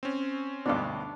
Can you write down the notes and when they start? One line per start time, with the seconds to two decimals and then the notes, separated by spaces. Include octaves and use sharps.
0.03 C4 C#4
0.66 D2 G2 B2 D4 D6